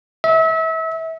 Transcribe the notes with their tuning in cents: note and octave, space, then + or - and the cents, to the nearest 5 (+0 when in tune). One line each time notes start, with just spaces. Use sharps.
E5 -30